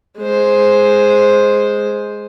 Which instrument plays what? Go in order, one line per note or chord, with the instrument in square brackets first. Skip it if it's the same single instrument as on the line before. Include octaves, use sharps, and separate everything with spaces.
[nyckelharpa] G#3 C5